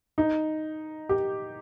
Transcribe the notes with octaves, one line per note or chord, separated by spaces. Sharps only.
D#4
G4